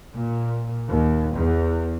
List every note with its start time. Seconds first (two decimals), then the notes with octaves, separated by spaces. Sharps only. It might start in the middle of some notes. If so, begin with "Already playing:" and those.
0.14 A#2
0.90 D#2
1.36 E2